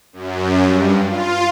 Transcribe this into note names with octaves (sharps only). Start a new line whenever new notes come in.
F#2
G2
F4